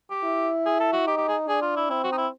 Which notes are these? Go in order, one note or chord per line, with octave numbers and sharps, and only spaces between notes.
G4
E4
G#4
A4
F#4
D#4 G4
G4
G#4
D4 G#4
F4
E4
C4 E4
F#4
D#4
E4